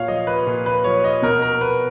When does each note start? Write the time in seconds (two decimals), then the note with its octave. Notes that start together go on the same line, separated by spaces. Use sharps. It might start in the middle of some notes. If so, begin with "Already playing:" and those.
Already playing: A#2 C#5 F5
0.08 F3 D#5
0.27 B4
0.47 A#2
0.66 B4
0.84 F3 C#5
1.04 D#5
1.22 B2 A#4
1.42 A#4
1.61 B4